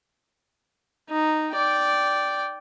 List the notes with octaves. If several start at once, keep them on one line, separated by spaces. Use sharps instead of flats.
D#4
D5 G5